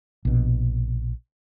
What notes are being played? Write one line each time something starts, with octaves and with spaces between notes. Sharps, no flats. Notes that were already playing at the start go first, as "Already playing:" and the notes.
A#1 B2